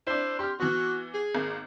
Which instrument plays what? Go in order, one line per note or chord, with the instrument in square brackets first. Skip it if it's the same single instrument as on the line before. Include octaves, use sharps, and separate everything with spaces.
[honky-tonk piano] D4 E4 [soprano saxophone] C5
[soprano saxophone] G4 [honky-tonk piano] C6 F6
[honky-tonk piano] E3 B3 [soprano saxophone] F#4
[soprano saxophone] G#4
[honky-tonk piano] G#1 A#3